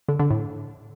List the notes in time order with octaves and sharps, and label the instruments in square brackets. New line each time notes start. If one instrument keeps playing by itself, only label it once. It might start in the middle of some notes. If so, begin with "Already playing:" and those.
[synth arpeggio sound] D3
D3
A2